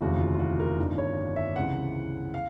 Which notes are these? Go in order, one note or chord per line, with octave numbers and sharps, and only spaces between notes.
F1 D#2 C#3 E3 F#4
F4
F4
F#4
A#4
G1 G2 D#3
C#5
E5
C#2 C3 E3 F#5
F5